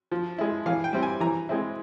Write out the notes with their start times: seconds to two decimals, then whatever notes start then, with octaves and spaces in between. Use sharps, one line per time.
0.11 F3
0.38 G#3 E4
0.66 E3 F5
0.84 G5
0.93 G3 C4 E4
1.03 G#5
1.20 E3 A#5
1.49 G#3 C4 E4